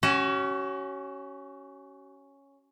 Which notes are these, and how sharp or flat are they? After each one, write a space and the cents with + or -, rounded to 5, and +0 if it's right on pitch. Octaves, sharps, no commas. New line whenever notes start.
C#4 +0 F#4 +40